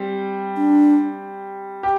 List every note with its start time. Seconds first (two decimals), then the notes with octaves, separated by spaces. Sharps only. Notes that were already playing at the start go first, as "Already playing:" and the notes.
Already playing: G3 C4
0.57 D4
1.83 G4